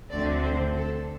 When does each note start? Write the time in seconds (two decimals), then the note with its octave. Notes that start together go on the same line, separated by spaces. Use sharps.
0.11 D2 D3 A3 C4 D5
0.44 C5
0.77 A4